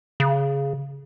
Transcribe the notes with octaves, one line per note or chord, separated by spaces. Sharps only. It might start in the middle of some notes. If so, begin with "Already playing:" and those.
C#3